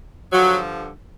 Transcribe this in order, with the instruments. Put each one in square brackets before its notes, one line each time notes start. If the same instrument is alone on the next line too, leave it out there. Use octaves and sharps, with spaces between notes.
[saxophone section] G2 D3 F3 F#3